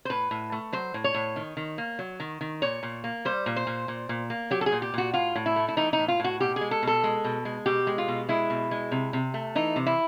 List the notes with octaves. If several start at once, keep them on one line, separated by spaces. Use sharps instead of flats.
C5
A2 B4
A2
A3
F#3 C5
A2
C#5
A2
D#3
D#3
A#3
F#3
D#3
D#3
A#2 C#5
A#2
A#3
G3 C5
A#2
C5
A#2
A#2
A#2
A#3
F#3 G4
A4
G#4
A#2
G4
A#2 F#4
A2 F4
A2
E4
A3
E4
E3 D#4
D#4
A2
F4
A2 F#4
B2 G4
G#4
G#3
A4
B2 A4
G#3
B2
G#3
B2 G4
G#3
F4
B2
G#3 E4
B2
G#3
C3
C3
A3
E3 D#4
C3
E4